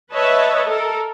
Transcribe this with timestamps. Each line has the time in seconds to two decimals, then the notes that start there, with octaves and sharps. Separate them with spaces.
0.12 B4 C#5 D#5 E5 A5
0.67 A4 A#4